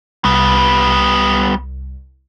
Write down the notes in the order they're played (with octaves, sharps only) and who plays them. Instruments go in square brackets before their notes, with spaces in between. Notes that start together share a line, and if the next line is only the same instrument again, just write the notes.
[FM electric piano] C2 [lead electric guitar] G3 B3